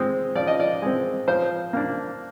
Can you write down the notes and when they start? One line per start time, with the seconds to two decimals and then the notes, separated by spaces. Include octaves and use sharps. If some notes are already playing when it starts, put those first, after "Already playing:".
Already playing: G#3 C4
0.35 F3 D5
0.47 D#5
0.60 D5
0.82 G#3 C4
1.28 F3 C5
1.73 A#3 D4